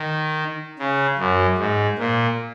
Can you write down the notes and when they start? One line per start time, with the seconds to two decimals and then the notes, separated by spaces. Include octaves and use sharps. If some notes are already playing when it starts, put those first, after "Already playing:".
Already playing: D#3
0.79 C#3
1.19 F#2
1.59 G#2
1.98 A#2